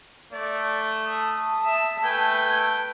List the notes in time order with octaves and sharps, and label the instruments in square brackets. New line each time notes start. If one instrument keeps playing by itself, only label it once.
[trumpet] A3 [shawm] D5
[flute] A5 [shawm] D#6
[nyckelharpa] E5
[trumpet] A3 [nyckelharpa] B4 G5 [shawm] G#5